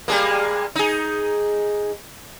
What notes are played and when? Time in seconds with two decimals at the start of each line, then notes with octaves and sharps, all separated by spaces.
0.08 G3 G#3 A#3
0.76 D#4 G#4